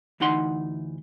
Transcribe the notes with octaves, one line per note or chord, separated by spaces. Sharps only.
D2 E3 D#4 F#5 C6